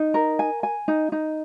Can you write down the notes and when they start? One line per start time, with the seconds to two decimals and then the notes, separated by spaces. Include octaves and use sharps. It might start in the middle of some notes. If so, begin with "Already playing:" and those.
Already playing: D#4
0.14 A#4
0.39 G#5
0.63 G#5
0.88 D#4
1.12 D#4